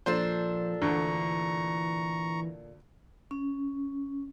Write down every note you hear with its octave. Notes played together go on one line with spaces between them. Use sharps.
A#2 F3 D4 A4 C5
D2 D3 E3 A#5 C#6
C#4